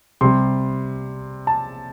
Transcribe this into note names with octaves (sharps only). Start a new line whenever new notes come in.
C3 G3 C6
A5